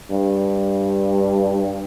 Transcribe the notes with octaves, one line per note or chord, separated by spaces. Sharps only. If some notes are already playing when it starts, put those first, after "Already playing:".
G2